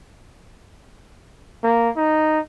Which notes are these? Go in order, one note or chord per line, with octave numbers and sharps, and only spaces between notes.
A#3
D#4